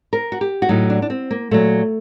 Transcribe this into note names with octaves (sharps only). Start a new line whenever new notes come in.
A#4
F#4
G4
F#4
A2 F#3 D#4
D4
D4
C4
A#3
A#2 F#3 A3